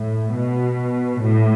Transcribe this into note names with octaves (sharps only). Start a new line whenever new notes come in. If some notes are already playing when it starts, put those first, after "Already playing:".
Already playing: A2
B2
A2